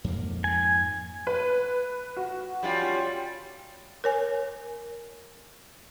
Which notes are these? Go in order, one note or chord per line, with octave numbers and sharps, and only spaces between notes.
F2 G#2 A#3
G#5
B4
F#4
G3 C#4 F4
A#4 C#5 G#5